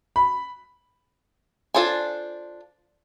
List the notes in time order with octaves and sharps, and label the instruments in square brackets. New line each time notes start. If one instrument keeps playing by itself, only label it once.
[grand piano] B5
[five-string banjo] D4 F4 A4 C5 G#5